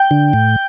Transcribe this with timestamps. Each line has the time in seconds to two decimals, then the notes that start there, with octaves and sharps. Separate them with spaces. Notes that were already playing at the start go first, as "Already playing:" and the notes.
Already playing: G5
0.11 D3
0.33 A2